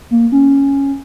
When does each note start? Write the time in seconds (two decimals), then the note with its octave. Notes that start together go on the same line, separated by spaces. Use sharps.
0.11 A#3
0.32 C#4